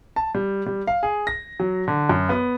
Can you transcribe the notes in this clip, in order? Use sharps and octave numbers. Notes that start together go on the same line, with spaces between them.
A5
G3
G3
F5
G#4
A#6
F#3
D3
F#2
B3